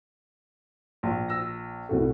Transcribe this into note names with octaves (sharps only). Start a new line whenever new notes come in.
A#1
E6 A#6
C2 A2 A3 F#4